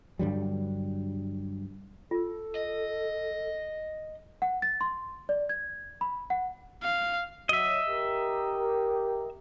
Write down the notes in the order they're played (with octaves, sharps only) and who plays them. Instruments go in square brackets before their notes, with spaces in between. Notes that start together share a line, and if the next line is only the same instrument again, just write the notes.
[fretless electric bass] G2 D3 F#3 G3
[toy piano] F4 [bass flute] A4
[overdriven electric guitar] D#5
[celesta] F#5
A6
C6
D5
G#6
B5
F#5
[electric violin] F5
[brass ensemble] F#3 [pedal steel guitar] D#5 E5
[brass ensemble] G4 A#4